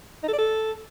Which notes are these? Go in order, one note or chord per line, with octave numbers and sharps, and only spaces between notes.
D#4
A4
D5
A4